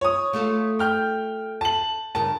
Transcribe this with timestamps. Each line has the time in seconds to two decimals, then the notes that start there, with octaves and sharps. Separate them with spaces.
0.01 C#5 D#6
0.33 A3 F4 A4
0.79 G5 F6 G6
1.61 A5 F#7
2.15 G2 C#3 A#4 A5